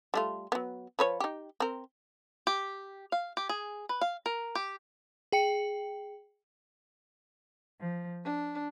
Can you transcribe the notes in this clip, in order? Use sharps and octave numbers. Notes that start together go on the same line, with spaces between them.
G3 A3 F4
F#3 B3
F3 B4 C#5
D#4 G4
C4 A#4
G4
F5
G4
G#4
B4
F5
A#4
G4
G#4 G5 C#7
F3
D4